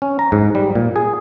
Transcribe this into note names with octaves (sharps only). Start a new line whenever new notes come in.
C#4
A#5
G#2
G3
A#2
G#4